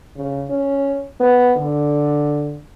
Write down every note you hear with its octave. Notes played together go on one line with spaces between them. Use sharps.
C#3
C#4
B3
D3